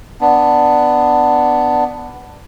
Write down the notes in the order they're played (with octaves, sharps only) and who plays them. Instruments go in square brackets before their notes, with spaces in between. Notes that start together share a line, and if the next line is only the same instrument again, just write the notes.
[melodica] B3 D4